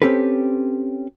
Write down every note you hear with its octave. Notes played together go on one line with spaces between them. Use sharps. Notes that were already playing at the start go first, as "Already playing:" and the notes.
C4 C#4 G4 A4 B4